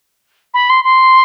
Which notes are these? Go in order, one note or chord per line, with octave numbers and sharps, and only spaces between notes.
B5
C6
C6